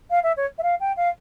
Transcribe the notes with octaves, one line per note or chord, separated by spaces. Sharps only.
F5
E5
C#5
E5
F5
G5
F5